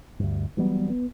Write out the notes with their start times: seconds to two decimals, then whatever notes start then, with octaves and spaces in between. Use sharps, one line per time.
0.19 D2 G2
0.57 E3 F#3 G3 B3
0.90 B3